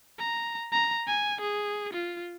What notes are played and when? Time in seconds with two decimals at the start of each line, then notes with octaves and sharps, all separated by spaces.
0.19 A#5
0.72 A#5
1.07 G#5
1.41 G#4
1.93 F4